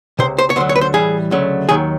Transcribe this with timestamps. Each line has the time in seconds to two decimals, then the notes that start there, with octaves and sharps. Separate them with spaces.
0.19 C#2 C3 C5
0.38 C5
0.50 C#5
0.56 D2 D3 F#3 C5
0.69 C#5
0.76 B4
0.81 C5
0.94 A2 E3 G3 G#4
1.31 D2 C#3 F#3 A3
1.69 D#2 D#3 F#3 G#4